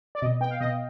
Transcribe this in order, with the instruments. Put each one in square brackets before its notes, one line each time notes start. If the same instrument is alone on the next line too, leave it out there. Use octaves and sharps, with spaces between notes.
[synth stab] D5
B2 D#5
B3 G5
F5
B2 D#5